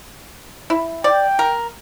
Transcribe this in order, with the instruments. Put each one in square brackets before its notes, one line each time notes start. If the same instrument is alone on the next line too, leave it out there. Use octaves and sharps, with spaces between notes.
[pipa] E4
[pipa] D5 [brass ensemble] G5
[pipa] A#4